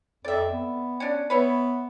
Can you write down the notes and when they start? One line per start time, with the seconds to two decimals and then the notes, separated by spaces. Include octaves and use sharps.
0.25 F2 D5 E5
0.51 B3
1.00 C#4 D4
1.30 B3 B4 C#5 E5